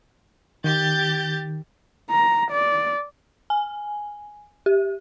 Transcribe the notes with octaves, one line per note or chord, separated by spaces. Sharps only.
D#3 G4 G6 A6
A#5
D5
G#5
G4